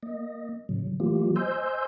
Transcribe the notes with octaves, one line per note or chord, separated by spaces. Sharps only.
A#3 D#5
A2 C#3 F#3
E3 F#3 A3 A#3 F4 G4
C5 D#5 G#5 C6 E6 G6